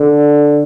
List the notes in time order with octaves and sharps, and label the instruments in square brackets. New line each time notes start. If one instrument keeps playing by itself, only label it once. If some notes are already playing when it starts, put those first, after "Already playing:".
Already playing: [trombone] D3